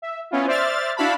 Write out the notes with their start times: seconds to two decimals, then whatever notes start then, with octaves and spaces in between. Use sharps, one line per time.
0.02 E5
0.31 B3 C#4 E4 F4
0.47 C5 D5 E5 F6 A6
0.96 D4 E4 F#4 F5 A5 B5